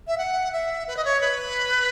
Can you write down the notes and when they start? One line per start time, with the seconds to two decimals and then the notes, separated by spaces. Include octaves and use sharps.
0.08 E5
0.18 F#5
0.53 E5
0.88 B4
0.97 D#5
1.05 C#5
1.21 B4